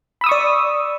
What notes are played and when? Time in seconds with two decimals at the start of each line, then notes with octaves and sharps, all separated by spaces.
0.21 B5
0.24 E6
0.26 D#6
0.29 C#6
0.32 D5